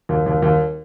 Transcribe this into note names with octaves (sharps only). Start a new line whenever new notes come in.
D#2
D#2
D#2